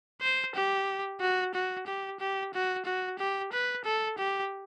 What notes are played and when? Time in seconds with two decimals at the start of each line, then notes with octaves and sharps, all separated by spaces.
0.21 C5
0.55 G4
1.20 F#4
1.54 F#4
1.86 G4
2.20 G4
2.53 F#4
2.85 F#4
3.19 G4
3.52 B4
3.84 A4
4.18 G4